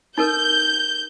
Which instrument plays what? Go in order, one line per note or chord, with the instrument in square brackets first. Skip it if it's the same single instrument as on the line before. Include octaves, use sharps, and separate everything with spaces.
[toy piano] D#4 A4 A#4 [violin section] G6